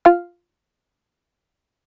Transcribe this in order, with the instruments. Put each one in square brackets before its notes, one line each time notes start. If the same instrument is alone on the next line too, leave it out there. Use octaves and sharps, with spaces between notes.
[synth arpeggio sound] F4 F5 F6